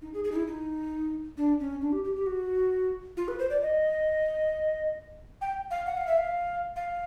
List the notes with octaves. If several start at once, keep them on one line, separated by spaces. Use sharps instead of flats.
D#4
G#4
G#4
D#4
E4
D#4
D4
C#4
D4
G4
G4
G4
F#4
F4
B4
C5
D5
D#5
G5
F5
F#5
F5
E5
F5
F5